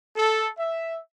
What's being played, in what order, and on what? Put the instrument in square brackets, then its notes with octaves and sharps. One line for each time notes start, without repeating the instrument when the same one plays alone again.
[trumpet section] A4
E5